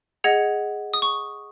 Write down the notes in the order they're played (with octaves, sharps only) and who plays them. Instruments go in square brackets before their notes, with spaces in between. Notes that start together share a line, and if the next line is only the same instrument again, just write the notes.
[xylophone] G#4 D#5 F#5 G#6
D#6
C#6